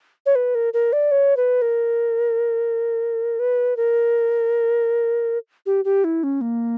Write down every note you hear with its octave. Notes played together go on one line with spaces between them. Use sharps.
C#5
B4
A#4
A#4
D5
C#5
B4
A#4
B4
A#4
G4
G4
E4
C#4
A#3